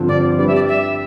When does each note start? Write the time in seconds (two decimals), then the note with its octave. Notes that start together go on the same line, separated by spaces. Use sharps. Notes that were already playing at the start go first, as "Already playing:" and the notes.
Already playing: G2 D3 F3 C4 F4
0.08 D5
0.38 G3 D4 G4 B4 D5
0.47 E5
0.55 D5
0.68 E5